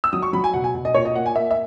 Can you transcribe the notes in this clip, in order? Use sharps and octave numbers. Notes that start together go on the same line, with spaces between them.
E6
F#3 D#6
C#6
F#3 B5
G#5
B2 F#5
G#5
B2
D#5
A#2 C#5
D#5
A#3 F#5
G#5
A#3 E5
E5